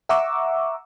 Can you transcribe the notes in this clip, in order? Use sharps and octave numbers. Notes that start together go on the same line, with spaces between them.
E5 F#5 A#5 C#6 D6 E6